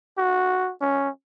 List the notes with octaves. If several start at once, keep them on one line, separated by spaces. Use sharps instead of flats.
F#4
C#4